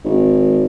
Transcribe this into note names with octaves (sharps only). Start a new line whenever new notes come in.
G#1